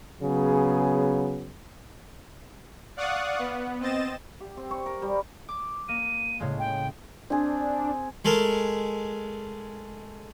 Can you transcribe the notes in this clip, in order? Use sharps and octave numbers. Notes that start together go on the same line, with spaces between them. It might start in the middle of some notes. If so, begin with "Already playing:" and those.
C#3 F#3 B3 G#4
D5 F5 F#5 C#6 D#6 F#6
B3
C4 D#5 A6 E7
G4
C4
C#6
A#4
G3
D6
A#3 D#7
A2 C#3 G#3
G5
C4 D4 G#4
G#3 A3 A#4